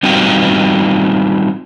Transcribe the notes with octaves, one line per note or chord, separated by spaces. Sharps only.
G3 C4 D#4 F4 F#4 G5